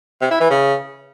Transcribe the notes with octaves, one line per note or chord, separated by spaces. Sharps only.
C3
E4
E3
C#3